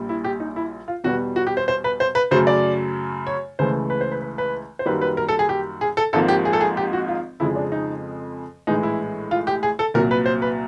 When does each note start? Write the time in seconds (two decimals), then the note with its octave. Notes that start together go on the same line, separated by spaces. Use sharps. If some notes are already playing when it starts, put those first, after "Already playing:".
Already playing: A#1 A#2 G3
0.09 E4
0.24 G4
0.40 D#4
0.56 E4
0.88 F4
1.04 E2 B2 G3 F#4
1.36 F#4
1.47 G4
1.57 C5
1.68 C5
1.84 B4
2.00 C5
2.15 B4
2.31 F#2 C#3 F#3 A3 C5
2.47 D5
3.27 C#5
3.59 C#2 C#3 E3 A3 C5
3.90 B4
4.01 C5
4.12 B4
4.22 B4
4.38 B4
4.79 C5
4.86 F#2 D#3 G3 A#3 B4
5.01 B4
5.17 A#4
5.29 A4
5.39 G#4
5.49 G4
5.81 G#4
5.97 A4
6.13 G#1 G#2 F3 A#3 A4
6.28 G4
6.45 G#4
6.53 A4
6.61 G#4
6.77 G4
6.93 F#4
7.08 F4
7.40 F2 C#3 F3 G#3 E4
7.56 D4
7.72 D#4
8.67 A#1 A2 E3 G#3 D#4
8.83 E4
9.31 F4
9.47 G4
9.63 G#4
9.79 A4
9.94 C2 A#2 F#3 A#4
10.11 B4
10.26 C5
10.42 B4